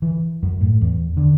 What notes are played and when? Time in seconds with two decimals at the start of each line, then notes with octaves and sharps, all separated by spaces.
0.02 E3
0.43 F#2
0.61 A2
0.81 E2
1.17 D3